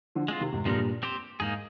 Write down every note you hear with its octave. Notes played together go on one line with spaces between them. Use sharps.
D3 F3
G#3 C4 F4
C3 D#3
G#2 C3
G2 A#2 D3 F3 G#3 D#4 A#4
C4 G4 C5
G#2 A#3 D#4 G#4